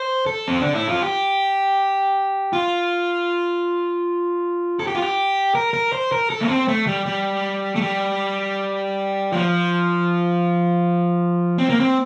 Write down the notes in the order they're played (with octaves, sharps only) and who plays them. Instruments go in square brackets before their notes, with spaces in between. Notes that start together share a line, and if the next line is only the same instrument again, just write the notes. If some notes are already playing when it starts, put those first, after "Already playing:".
Already playing: [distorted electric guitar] C5
A4
C4
D4
E4
F4
G4
F4
A4
G4
F4
G4
A#4
A#4
C5
A#4
A4
A#3
C4
A3
G3
G3
A3
G3
F3
C4
A#3
C4